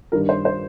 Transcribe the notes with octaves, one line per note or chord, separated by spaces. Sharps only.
G2 D#3 G3 A#4
C5
C5